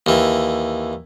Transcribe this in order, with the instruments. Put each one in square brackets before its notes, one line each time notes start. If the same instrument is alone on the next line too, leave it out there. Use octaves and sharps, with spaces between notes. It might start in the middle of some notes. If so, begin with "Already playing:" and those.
[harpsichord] D#2 E3